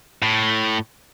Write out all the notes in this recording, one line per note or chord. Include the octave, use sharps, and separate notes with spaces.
A2